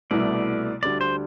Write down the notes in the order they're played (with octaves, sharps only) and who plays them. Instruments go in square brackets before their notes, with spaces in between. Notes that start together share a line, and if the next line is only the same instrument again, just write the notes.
[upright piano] C2 B2 A3 E4 [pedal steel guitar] D5
[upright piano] D2 D3 G3 D4 [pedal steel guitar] D5
[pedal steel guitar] C5